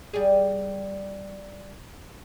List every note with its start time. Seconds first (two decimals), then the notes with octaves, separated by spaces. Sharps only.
0.14 G3 G#4